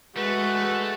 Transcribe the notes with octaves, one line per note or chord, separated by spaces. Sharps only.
G#3 A3 F#4 B4